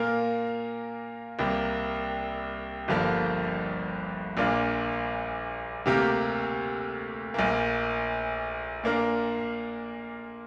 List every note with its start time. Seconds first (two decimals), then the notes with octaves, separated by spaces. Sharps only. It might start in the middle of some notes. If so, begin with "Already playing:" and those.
Already playing: A#2 A#3 F4 A#4
1.39 C2 C3 A#3
2.88 G1 G2 D3 F3 A#3
4.37 A#1 A#2 A#3 D4 F4
5.86 D2 C3 A#3 G4 A#4
7.34 A#1 A#2 A#3
8.84 A#2 A#3 D4 A#4